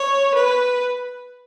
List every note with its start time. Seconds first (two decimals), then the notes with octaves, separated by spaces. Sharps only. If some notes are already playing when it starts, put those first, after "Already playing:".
Already playing: C#5
0.34 B4